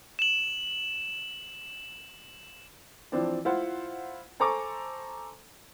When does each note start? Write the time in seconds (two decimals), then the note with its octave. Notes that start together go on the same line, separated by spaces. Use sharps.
0.19 E7 F#7
3.12 E3 F3 C4 D4
3.45 E4 F4 C5 F#5
4.40 A4 C5 G#5 A#5 C#6 D6